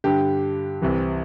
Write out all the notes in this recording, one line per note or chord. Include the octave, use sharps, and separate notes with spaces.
G2 D3 G4
C2 C3 E3